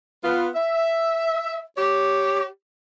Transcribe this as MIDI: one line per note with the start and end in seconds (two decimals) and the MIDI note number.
0.24 0.48 59
0.24 0.48 65
0.55 1.59 76
1.77 2.44 67
1.77 2.44 73